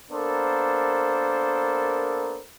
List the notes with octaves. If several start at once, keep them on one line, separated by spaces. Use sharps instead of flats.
A#3 B3 D4 A4 A#4 C5